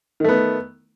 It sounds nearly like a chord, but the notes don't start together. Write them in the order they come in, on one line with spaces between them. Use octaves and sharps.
D#3 A3 B3